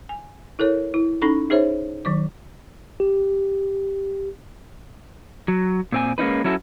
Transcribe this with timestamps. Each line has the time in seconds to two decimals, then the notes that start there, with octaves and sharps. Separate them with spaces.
0.09 G#5
0.59 E4 A4 A#4 C#5
0.94 E4
1.22 C#4 D#4 A4 B5 C#6
1.50 D#4 G#4 C5 C#5 E5
2.05 D#3 F#3 D6
3.00 G4
5.48 F#3
5.92 A#2 C4 G#5
6.18 G#3 A#3 C#4 D#4 B4
6.44 F#3 C#4 E4 F#4 A4